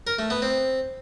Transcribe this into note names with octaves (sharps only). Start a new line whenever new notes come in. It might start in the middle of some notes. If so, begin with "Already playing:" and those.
A#4
A3
B3
C4